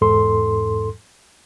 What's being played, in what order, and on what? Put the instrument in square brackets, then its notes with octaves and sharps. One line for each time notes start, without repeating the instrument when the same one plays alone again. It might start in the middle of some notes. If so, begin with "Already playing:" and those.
[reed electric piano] E2 G#2 A4 C6